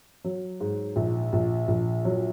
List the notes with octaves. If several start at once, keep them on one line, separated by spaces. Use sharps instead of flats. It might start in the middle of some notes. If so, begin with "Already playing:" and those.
F#3
G#2
A#1
A#1
A#1
F#3